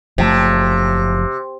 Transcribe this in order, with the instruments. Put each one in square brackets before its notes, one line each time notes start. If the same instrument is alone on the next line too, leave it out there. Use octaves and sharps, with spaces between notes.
[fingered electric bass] F#1 F3 A3 [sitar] C3